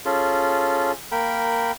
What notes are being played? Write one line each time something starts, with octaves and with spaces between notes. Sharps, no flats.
C#4 F4 G#4 A4
A#3 A#4 G5 B5